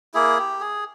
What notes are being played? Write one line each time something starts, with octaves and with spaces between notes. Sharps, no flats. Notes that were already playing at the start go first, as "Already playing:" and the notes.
A#3 E4 G#4
G4
G#4